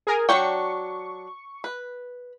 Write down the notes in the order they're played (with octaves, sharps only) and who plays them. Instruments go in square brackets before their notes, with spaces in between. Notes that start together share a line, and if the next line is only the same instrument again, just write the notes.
[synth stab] G#4 A#4 G#5
[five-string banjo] F#3 D4 G5 [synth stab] C#6
[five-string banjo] B4